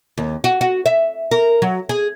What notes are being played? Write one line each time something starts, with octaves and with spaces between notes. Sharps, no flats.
D#2
F#4
F#4
E5
A#4
F#3
G#4